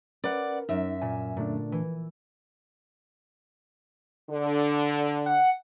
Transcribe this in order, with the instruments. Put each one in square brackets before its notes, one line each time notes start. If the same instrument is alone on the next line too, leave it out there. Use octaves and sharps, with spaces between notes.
[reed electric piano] C#4 B4 [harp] A#4 [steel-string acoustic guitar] D5 F#5
[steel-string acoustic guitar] F#2 E5 [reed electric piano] D#4
[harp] A#2 [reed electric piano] G#5
[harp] A#2 [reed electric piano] D3 A3 D4
[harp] E3
[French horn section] D3
[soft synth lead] F#5